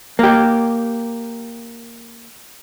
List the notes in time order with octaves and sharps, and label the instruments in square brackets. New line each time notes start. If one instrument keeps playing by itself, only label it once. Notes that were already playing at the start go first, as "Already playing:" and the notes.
[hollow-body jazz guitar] A#3 G4